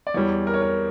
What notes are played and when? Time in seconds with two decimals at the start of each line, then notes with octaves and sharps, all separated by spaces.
0.07 D5
0.14 E2 E3 G3 C#5
0.47 A#4
0.54 C#5
0.62 A#4